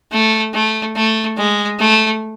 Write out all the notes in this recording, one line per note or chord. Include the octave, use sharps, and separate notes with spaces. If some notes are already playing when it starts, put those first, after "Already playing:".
A3
A3
A3
G#3
A3